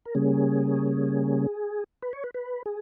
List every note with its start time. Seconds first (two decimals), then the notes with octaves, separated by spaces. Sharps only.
0.05 A#4
0.15 C#3 G3 A#3 C#4 G#4
2.02 B4
2.13 C#5
2.24 B4
2.34 B4
2.66 G#4